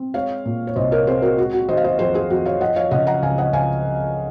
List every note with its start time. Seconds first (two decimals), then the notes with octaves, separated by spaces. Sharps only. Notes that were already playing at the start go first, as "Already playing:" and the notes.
Already playing: C4
0.14 G#3 C#5 F5
0.45 A#2
0.67 C#5
0.76 C2 C5 D#5
0.92 A#4 C#5
1.06 C4 G#4 C5
1.22 F#4 A#4
1.37 G#3 F#4
1.53 F#4
1.68 D#3 C5 D#5
1.77 F5
1.84 C5 D#5
1.99 F2 G#4 C5
2.14 G#4 C5
2.30 F2 F#4
2.45 C#5 F5
2.61 F3 D#5 F#5
2.76 C#5 F5
2.91 C#3 D#5 F#5
3.07 F#5 A#5
3.22 C#2 F5 G#5
3.38 D#5 F#5
3.53 C#2 F5 G#5